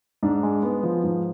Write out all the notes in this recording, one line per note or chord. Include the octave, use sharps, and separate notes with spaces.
G#2 D4
G#3
B3
F3
G#2